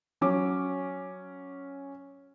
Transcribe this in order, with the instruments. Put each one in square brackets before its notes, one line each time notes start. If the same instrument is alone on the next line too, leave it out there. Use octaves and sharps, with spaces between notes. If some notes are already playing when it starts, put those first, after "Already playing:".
[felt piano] F#3 C#4 D6